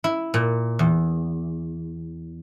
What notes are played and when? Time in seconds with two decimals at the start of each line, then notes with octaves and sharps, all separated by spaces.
0.04 E4
0.34 A#2
0.79 E2